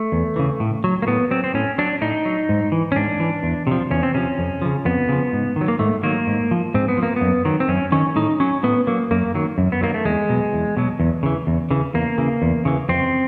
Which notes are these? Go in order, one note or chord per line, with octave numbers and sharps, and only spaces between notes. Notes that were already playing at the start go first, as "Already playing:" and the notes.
Already playing: A3
E2
C#3 E3
A2
F#3
A#3
A2 B3
F#3 C4
C4
A2 C#4
F#3 D4
A2 D#4
F#3
G#2
E3
C#4
G#2 D4
E3
E2
C3 F3
E2 C#4
C4
C3 F3 C#4
F2
C#3 F3
F2 B3
C#3 F3
G#2
D#3 F#3
A#3
G#2 A3
D#3 F#3 A#3
G#2
F3
G#2 C4
B3
F3
A#3
B3
F#2
D#3 F#3
C4
F#2 C#4
D#3 F#3 C#4
A2 D#4
F#3 C#4
A2 B3
F#3 A#3
F#2 A#3
D#3 F#3
F#2
B3
D#3 F#3 A#3
A3
E2 G#3
B2 F#3
E2
B2 F#3
E2
C#3 E3
E2
C#3 E3
E2 A#3
C#3 E3
E2
C#3 E3
F2 C4